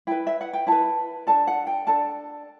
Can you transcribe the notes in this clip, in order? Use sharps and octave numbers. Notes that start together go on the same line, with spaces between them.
E4 B4 G5
E5
F#5
G5
E4 B4 A5
D4 A4 A5
F#5
G5
D4 A4 A5